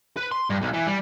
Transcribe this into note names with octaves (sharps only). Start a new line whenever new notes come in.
B4
C6
G2
B1
E3
G3